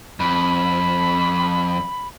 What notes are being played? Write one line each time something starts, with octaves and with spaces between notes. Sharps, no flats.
F2 B5